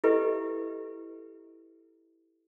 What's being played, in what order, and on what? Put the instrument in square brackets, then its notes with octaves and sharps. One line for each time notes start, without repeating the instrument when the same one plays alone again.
[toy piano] E4 G4 A4 B4 D#5 E5